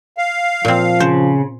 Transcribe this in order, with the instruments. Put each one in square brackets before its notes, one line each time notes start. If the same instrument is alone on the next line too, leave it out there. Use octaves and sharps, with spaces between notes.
[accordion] F5
[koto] A#2 C4 [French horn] F3
[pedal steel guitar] C#3 [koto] C5